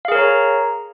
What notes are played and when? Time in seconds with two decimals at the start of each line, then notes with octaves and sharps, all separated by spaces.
0.05 F5
0.08 G#4
0.12 A#4
0.15 C#5
0.19 A#5